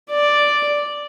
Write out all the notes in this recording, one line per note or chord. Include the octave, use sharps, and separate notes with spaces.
D5